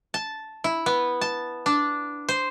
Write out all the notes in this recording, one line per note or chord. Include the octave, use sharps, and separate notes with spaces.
A5
E4
B3
A5
D4
C5